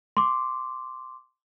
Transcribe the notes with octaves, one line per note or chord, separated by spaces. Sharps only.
C6 D6